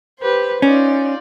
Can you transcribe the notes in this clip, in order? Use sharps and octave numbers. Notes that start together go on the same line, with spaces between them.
G4 B4 C5
C#4 D#4 F4 D5